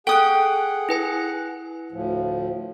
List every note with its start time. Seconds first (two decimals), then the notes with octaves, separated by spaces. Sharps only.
0.07 G#4 A4 F#5 G5 D#6 F#6
0.89 E4 B4 G#5
1.92 D2 A2 F3